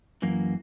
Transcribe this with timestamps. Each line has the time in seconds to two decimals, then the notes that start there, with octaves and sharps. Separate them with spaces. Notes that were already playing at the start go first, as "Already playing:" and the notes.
0.22 F#2 E3 A#3